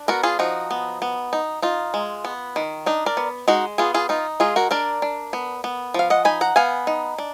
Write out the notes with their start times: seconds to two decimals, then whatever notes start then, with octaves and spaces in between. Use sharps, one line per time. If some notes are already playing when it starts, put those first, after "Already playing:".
Already playing: D4
0.08 B3 F#4 A#4
0.23 F4 G#4
0.39 F3 D#4 F#4
0.71 B3
1.02 B3
1.33 D#4
1.62 D#4 F4
1.94 G#3
2.25 B3
2.56 D#3
2.86 D4 D#4
3.06 A#4 D5
3.17 B3
3.48 G#3 D#4 F#4
3.78 B3 F4 G#4
3.94 F4 G#4
4.09 D#4 F4
4.40 G#3 F4 G#4
4.56 F#4 A#4
4.71 D4 A#4 D5
5.02 D4
5.33 B3
5.64 B3
5.94 F3 F5
6.10 D#5 F#5
6.25 D#4 G#5 B5
6.41 F#5 A#5
6.56 B3 F5 G#5
6.87 D#4
7.18 D4